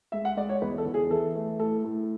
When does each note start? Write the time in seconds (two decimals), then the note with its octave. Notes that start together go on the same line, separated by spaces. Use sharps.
0.12 G#3 E5
0.25 F#5
0.37 G#3 D5
0.49 C#5
0.62 E2 B4
0.78 A4
0.86 E2
0.94 G#4
1.11 E3 A4
1.36 A3
1.60 A2 A4
1.84 A2